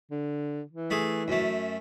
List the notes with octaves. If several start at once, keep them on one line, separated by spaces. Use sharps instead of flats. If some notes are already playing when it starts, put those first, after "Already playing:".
D3
E3
A3 G#4
F#2 A3